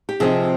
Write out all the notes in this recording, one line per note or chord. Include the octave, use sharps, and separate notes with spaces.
G4
C3 F3 C4 D#4 G#4